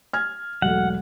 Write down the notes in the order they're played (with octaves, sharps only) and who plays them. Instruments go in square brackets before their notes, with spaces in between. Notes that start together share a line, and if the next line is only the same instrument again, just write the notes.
[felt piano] F6 G#6
[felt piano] E1 B1 A3 [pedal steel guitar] F#5